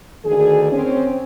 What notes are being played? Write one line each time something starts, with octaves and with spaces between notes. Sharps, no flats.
D2 D#3 G#4
C4 C#4